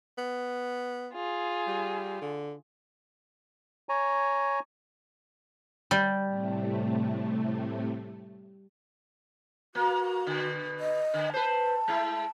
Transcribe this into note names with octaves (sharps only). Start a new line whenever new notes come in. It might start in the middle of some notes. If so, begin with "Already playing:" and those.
B3
F4 G#4
G3
D3
C#5 G#5 A#5
G3
A2 C3 A3
A#3 F#4
B2 D3
D#5
D3
B4 C5 A5
G#3 E4